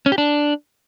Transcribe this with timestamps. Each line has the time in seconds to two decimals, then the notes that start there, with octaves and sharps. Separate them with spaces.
0.06 C#4
0.12 G4
0.18 D4